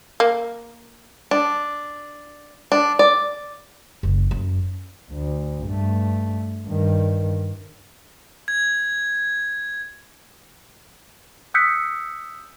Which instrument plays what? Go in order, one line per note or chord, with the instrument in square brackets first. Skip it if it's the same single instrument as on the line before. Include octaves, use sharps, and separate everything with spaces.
[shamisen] A#3
[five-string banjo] D4
D4
D5
[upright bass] F#1
F#2
[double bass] D2
G2 A3
G2 D#3
[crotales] G#6
[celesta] D#6 E6 F#6 G6 B6 C#7